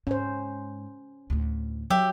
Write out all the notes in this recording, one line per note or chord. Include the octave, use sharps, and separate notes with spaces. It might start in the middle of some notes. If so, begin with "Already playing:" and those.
G#2 C#4 C5
D2 A2
F#3 G4 E5